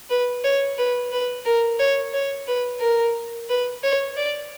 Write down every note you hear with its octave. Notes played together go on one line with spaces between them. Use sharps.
B4
C#5
B4
B4
A#4
C#5
C#5
B4
A#4
B4
C#5
D5